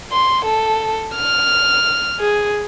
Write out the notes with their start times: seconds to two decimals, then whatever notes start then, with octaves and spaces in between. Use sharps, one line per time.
0.12 C6
0.45 A4
1.15 F6
2.19 G#4